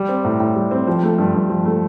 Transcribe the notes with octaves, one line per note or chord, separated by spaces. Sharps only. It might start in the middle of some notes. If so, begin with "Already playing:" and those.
Already playing: G3
C4
A2
A2
G3
C4
F3
A3
G2
G2
F3
A3